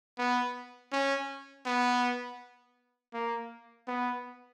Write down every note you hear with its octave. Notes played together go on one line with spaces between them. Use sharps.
B3
C#4
B3
A#3
B3